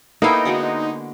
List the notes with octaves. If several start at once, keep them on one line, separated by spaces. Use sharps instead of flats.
A#3 B3 D#4 E4 A4 F5 G5
D3 G#3 F#4